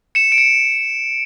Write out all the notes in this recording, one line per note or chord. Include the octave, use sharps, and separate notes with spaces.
C#7 E7
D7
C#7 E7